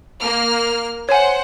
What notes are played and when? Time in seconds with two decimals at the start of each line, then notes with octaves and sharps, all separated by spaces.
0.22 A#3 F6
1.09 C5 C#5 F#5 G#5